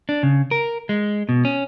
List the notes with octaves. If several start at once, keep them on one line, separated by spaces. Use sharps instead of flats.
D4
C#3
A#4
G#3
B2
C#4